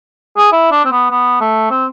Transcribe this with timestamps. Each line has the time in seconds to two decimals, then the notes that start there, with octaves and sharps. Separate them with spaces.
0.37 G#4
0.52 E4
0.71 D4
0.85 C4
0.91 B3
1.11 B3
1.40 A3
1.70 C4